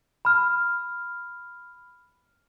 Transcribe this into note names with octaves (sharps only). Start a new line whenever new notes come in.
B5 F6